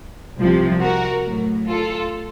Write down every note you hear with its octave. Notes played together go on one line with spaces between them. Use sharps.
C2 C3 F3
F#4 A#4
A2 F#3
F4 A4